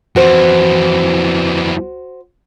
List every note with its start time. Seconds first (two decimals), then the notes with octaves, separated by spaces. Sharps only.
0.16 F2 E3 F#4 C5